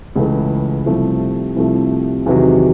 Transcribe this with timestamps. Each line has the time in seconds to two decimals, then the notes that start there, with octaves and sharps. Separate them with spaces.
0.16 C#2 C#3 E3 A3
0.86 C2 C3 F3 A3
1.56 C2 C3 F3 A3
2.26 E2 C3 D#3 F#3